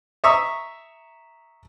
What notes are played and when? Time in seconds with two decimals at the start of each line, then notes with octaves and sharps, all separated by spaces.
0.24 E5 A#5 C#6 D#6 E6